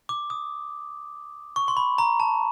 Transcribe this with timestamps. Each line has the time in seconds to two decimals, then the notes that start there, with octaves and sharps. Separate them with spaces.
0.09 D6
0.30 D#6
1.56 C#6
1.68 C6
1.77 B5
1.98 A#5
2.20 A5